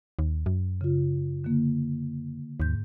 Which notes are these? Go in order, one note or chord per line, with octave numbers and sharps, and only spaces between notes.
D#2
F#2
C#3 F4
D3 A#3
D#2 G#2 G6